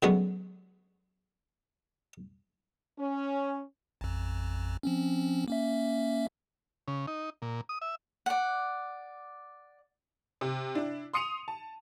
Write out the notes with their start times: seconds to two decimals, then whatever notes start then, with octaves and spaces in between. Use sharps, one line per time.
0.03 D3 F#3 G#3 B3 C#4
2.99 C#4
4.01 A1 F2
4.83 F3 C4 C#4
5.48 A#3 C#4 E5
6.88 C#3
7.08 D#4
7.42 A#2
7.69 D#6
7.82 E5
8.26 D5 F#5
10.41 C3
10.75 D4 E4
11.13 C6 D#6 C#7 D#7 F7
11.48 A5